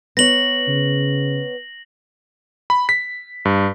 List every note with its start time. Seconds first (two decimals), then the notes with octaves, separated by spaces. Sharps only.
0.17 B3 C#5 A#6 F#7
0.67 C#3
2.70 B5
2.89 B6
3.45 G2